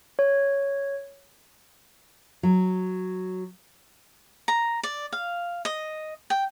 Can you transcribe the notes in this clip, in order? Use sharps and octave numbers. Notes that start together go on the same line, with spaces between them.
C#5
F#3
A#5
D5
F5
D#5
G5